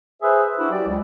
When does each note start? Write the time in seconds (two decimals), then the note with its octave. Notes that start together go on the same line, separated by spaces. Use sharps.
0.21 G#4 B4 C5 E5
0.57 D4 E4 F#4
0.70 F#3 G4 D5
0.87 C#2